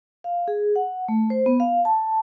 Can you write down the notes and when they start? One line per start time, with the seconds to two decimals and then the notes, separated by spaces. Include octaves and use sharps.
0.24 F5
0.48 G#4
0.76 F#5
1.08 A3
1.30 C5
1.46 B3
1.60 F5
1.85 A5